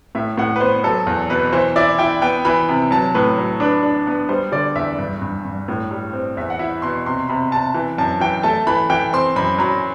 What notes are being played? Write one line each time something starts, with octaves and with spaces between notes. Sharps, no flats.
A2 E5
A2 F#5
B4
B3 C5
F#3 A4
E2
B2 B4
E3 C5
E4 D5
E4 G5
B3 G5
E3 B5
C3
F#3 A5
A2 B4
F#3
D4 B4
D4
B3
G3 C5
D3 D5
E2 E5
G2
G2
G2
A2
G3
C4
E2 E5
F#5
E4 E5
B2 C6
C3 C6
C3 B5
C3 A5
E3
F#2 A5
E3 G5
A3 A5
E3 B5
E3 G5
C4 C6
F#2 B5
F#3 B5